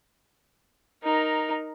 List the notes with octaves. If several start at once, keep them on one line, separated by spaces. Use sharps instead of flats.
D#4 A#4